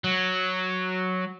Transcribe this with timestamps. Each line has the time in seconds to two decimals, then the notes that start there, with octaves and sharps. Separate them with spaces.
0.04 F#3